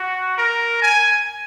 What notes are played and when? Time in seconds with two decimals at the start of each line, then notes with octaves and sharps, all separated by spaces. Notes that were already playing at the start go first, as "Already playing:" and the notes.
Already playing: F#4
0.38 A#4
0.82 G#5